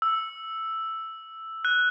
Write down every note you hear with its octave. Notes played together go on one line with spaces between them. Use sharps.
E6
F#6